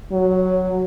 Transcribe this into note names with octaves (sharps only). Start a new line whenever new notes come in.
F#3